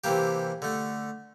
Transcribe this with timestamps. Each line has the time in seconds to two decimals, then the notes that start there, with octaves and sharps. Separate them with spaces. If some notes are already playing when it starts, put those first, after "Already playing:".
0.04 C3 E3 A#3 G4
0.62 D3 A3